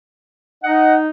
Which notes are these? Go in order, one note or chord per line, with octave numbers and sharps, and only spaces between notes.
D#4 D#5 F#5